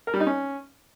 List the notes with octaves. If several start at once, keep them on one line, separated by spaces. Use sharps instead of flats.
A#4
G3
D#4
C#4